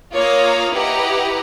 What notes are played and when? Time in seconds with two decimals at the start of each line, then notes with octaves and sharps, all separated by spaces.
0.13 A#3 F4 C#5 F5 A#5 D#6
0.72 E4 G4 B4 D#5 F#5 A#5